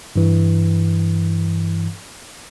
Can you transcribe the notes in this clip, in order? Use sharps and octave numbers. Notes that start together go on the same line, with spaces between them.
G2 E3